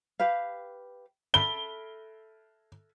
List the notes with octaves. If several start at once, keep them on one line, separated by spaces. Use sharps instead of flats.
G4 B4 F5
A4 E5 B5 G7